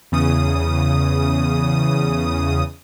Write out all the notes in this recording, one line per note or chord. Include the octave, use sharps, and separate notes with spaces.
E2 C#3 D#6